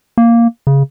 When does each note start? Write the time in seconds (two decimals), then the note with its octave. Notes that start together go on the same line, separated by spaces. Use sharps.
0.18 A#3
0.67 C#3